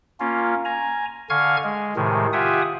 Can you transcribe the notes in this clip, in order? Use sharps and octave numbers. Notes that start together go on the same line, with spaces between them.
A#3 C#4 F4
G#5 A#5
D3 F5 G#5 C#6 F6 G#6
G#3
A2 C3 D#3 G#3
F4 G4 E5 F#5 G#5 D#6